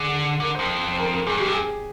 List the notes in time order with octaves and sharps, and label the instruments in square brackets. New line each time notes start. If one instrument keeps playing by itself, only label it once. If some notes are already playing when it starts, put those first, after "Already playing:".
Already playing: [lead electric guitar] D3 [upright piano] G#4
[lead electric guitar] D3 [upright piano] A#4
[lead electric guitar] F2 [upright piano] C5
[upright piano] C5
A#4
A#4
[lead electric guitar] G2 [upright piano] G#4
[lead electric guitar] F2 [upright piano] G4
[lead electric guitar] G2
[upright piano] G#4